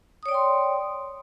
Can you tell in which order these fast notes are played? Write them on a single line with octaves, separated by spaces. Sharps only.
D#6 C#5 D5 G5 C6